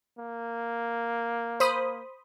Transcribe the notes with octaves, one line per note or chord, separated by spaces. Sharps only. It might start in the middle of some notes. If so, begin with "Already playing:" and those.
A#3
C5 B5 D#6